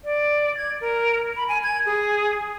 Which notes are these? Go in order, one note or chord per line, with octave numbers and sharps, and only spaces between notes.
D5
G#6
A#4
B5
G#5
G#6
G#4